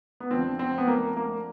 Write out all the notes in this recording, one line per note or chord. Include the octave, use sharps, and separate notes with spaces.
B3
F2 D3 F3 C4
C4
B3
A#3
A#3